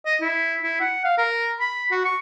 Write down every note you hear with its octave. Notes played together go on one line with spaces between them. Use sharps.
D#5
E4
E4
F#5
F5
A#4
B5
F#4
C#6